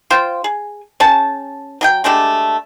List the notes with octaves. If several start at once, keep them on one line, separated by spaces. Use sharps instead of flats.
F4 C5 F5 G5
G#4
C#4 G#4 G5 A5
F#3 G#4 G5
G#3 A3 D4 G4